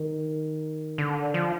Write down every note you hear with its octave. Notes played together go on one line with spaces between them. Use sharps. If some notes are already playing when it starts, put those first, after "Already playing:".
Already playing: D#3
D3
F3